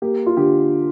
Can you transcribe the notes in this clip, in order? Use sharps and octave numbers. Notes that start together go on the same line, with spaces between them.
A#3 G4
F4
D3 G4